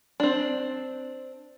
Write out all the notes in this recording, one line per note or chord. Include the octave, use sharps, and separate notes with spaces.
C4 D4